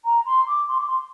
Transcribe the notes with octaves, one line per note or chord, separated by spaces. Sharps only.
A#5
C6
D6
C6
D6
C6